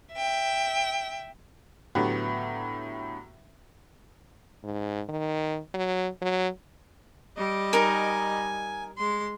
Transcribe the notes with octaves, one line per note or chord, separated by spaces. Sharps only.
E5 G5
A2 D3 F#3 B3 F#4 G4
G#2
D#3
F#3
F#3
G3 D#5
D#4 A#4 G#5
G#3 C6